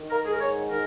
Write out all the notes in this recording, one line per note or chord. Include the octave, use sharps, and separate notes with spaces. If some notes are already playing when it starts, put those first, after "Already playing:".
Already playing: D#3
A#4
G#2 G#4
A#4
C#5
D#3 A#4